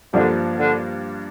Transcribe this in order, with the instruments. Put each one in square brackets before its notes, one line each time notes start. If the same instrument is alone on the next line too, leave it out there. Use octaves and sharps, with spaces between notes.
[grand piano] G2 F3 A#3 D4 [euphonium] D3
[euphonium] D3